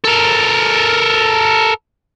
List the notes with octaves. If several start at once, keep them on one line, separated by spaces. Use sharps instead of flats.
A4 A#4